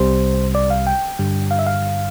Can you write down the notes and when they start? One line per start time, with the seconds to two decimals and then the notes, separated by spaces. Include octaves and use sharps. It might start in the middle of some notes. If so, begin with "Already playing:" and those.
Already playing: C2 C3 G3 C5
0.55 D5
0.70 F5
0.87 G5
1.19 G2 D3 G3
1.51 F5
1.59 E5
1.67 F5